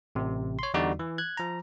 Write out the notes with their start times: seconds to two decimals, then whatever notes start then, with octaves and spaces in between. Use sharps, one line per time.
0.15 A1 C3
0.59 C#5 C6
0.74 E2 D3 G3 D#4 F#4 D5
0.99 E3
1.18 F#6 G#6
1.37 F3 A#5